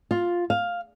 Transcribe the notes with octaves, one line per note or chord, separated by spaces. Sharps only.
F4
F5